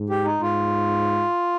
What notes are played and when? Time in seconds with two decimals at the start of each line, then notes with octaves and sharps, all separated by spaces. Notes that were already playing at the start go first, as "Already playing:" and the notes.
Already playing: G#2
0.10 G4
0.25 D#4
0.41 G#2 F4